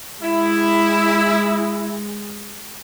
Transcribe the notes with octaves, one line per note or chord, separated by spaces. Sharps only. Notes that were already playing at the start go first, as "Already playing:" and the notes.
G#3 E4